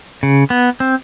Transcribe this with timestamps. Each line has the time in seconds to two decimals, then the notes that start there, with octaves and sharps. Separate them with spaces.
0.23 C#3
0.50 B3
0.80 C4